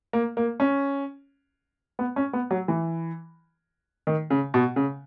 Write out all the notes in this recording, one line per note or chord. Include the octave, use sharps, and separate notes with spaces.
A#3
A#3
C#4
B3
C#4
B3
F#3
E3
D#3
C#3
B2
C#3